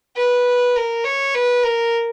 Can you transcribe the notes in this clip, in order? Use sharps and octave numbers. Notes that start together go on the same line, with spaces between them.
B4
A#4
C#5
B4
A#4